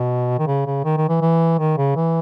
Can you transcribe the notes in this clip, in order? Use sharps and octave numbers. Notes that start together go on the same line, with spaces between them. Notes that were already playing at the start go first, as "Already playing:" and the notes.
Already playing: B2
D#3
C#3
C#3
D#3
D#3
E3
E3
D#3
C#3
E3